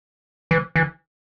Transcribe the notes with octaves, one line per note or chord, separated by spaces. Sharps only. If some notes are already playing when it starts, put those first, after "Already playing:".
E3
E3